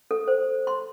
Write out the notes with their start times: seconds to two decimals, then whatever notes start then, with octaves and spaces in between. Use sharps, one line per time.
0.11 A4
0.28 C5
0.67 C6